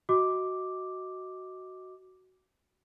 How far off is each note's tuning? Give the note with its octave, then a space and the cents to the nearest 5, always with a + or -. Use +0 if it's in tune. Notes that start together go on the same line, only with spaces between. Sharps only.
F#4 +10 D#5 +20 D6 +0